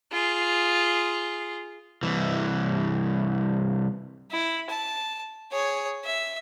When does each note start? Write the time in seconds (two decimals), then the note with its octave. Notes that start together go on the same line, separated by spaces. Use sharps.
0.12 F4 G#4
2.03 C2 E3
4.31 E4
4.70 A5
5.52 G#4 C#5
6.05 E5